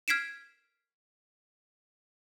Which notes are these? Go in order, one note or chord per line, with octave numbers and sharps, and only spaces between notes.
F6 G#6 B6 C7 D7 E7